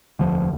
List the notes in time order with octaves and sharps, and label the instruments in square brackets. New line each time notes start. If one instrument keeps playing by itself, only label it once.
[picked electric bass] F1 D#2 D3 F3